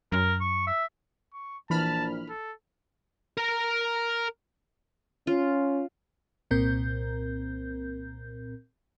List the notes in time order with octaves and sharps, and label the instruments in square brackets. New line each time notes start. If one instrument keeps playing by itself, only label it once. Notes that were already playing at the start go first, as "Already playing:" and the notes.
[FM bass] F#2 [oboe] A#4
[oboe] C#6
E5
[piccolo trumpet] C#6
[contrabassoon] A#1 [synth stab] E3 B5 F6 [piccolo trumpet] A5
[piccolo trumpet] A4
[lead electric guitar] A#4 A#5
[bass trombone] C#4 [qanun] F4
[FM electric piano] C2 A#2 C4 A#4 G6